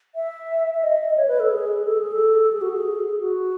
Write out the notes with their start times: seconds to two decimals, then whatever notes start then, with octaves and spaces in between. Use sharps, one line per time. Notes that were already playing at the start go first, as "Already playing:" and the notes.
0.15 E5
0.74 E5
0.83 D#5
1.10 D#5
1.17 C#5
1.28 B4
1.40 A4
1.51 G#4
1.85 A4
1.98 G#4
2.12 A4
2.53 G#4
2.61 F#4
2.69 G#4
3.21 F#4